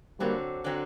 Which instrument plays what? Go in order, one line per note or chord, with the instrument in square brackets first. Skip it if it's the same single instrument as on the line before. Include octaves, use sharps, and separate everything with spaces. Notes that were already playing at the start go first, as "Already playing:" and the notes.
[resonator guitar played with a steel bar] D3 F#3 C4 [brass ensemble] G3 A#3
[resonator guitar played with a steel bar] D3 F#3 C4